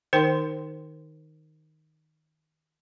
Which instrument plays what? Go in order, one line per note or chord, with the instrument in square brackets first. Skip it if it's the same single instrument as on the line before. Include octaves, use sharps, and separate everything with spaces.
[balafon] D#3 D#4 A#4 C5 G5